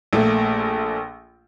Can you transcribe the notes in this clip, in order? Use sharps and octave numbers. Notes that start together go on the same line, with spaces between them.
A#1 A3 A#3